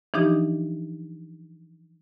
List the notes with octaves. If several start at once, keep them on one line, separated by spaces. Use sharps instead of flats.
E3 F3 D4 D#4 G4 D#5